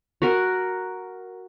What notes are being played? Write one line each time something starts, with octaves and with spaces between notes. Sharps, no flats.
F#4 A#4